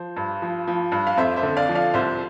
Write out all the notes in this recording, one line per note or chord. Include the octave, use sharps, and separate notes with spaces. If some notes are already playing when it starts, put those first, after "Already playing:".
Already playing: F3 C5
G2
F3
F3
G2
F5
F2 C5 E5
C5 E5
D3
D5 F5
F3
D5 F5
C2 C5 E5